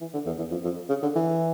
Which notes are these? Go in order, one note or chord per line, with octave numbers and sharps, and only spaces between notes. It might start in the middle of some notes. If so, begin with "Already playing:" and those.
E3
D3
E2
E2
F2
F2
C#3
D3
E3